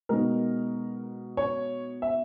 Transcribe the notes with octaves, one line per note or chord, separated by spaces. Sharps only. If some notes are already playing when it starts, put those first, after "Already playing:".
B2 G#3 D#4 A#4
C#5
E5